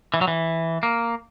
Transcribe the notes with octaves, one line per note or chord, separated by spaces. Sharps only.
E3
F#3
E3
A#3